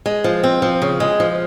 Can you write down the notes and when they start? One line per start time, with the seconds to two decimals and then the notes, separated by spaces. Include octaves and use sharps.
0.06 G#3
0.24 F3
0.43 C4
0.62 F3
0.82 C#3
1.00 G#3
1.20 F3